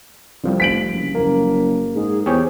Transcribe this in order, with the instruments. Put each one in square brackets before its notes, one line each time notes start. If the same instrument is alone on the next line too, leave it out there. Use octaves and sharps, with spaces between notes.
[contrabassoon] C2 [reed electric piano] D3 F3 G3
[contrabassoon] F1 [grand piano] B6 D7 F#7
[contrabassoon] F#1
[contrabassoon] F#1 [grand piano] A#3
[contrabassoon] G#2 [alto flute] G#4
[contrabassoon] E2 [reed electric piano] G4 G#4 C#5 [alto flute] C5